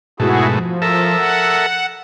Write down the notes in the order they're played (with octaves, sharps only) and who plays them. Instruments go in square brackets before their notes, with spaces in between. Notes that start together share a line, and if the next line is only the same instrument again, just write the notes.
[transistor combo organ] G#2 B2 A3 [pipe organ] E4 F#4 G#4
[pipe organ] F3
[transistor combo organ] A4 A#4 E5
[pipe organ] F#5